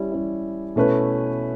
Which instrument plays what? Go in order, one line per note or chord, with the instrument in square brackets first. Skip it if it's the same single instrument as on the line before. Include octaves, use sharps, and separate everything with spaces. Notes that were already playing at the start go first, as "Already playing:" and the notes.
Already playing: [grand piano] G3 C#4 E4
G3 C#4 E4
B2 A3 C#4 E4 B4